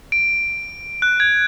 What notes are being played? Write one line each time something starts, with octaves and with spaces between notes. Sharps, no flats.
D7
F#6
G#6